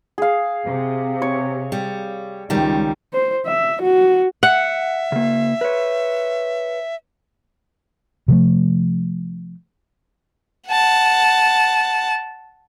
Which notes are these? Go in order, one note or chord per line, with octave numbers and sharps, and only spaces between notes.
G#4 F5
C3
C#5
G3
C#2 D#3 G3
C5
E5
F#4
E5 F#5
C#3 A#3
B4 C#5
C3 F3 A3
F#5 A5